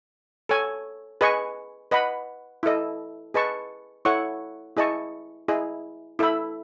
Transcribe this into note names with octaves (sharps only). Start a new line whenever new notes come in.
A4 C#5 G#5
G#4 B4 D#5 G#5 C#6
B4 D#5 F#5 B5
E4 A4 D#5
G#4 B4 D#5 A5 C#6
E4 A4 C#5 F#5 C#6
E4 G#4 D#5 A5 C#6
E4 G#4 D#5
E4 A4 E5 B5